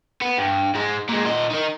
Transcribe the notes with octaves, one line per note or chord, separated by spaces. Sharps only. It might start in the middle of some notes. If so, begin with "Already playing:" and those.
B3
G2
G#2 G#3
A#2 G#3
A#2 D#5
D#3 D#4